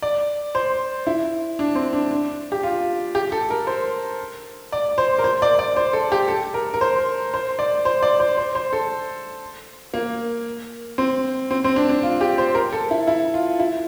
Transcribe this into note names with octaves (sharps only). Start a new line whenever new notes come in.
D5
C5
E4
D4
C4
D4
D4
G4
F4
G4
A4
A#4
C5
D5
C5
A#4
C5
D5
D5
C5
A4
G4
A4
A#4
A#4
C5
C5
D5
C5
D5
C5
C5
C5
A4
A#3
C4
C4
C4
D4
D4
F4
G4
C5
A#4
A4
E4
E4
F4
E4